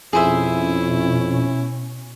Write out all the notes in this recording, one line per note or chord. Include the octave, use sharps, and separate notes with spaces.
F2 B2 C#4 E4 G#4 C5 E5